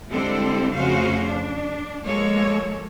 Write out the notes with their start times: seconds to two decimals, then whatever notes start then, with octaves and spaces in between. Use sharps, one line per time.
0.10 D3 G3 G#3 C4 E4 A4
0.74 F2 C#3 A3 F#4 C5 F5
1.28 D4
2.06 F3 G#3 A#3 A4 C#5